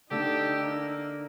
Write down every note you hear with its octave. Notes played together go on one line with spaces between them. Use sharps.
D3 A3 D#4 G4 E6
A#3